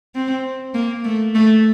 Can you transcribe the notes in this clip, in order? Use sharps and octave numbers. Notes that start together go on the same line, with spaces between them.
C4
A#3
A3
A3